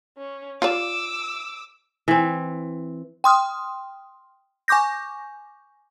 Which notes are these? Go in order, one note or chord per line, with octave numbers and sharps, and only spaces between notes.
C#4
F4 D5 D6 E6
E3 C4
G5 C6 D#6 F6
G#5 C#6 D6 G6 A#6